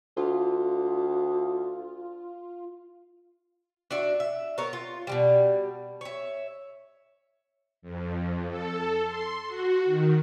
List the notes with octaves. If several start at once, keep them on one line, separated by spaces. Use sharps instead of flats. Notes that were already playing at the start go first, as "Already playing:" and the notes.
D2 F4
D4 F#4 E5
E5
B3 A#4 C#5
F4
B2 E3 G3
C#5 E5
F2
A4
C6
F#4
D#3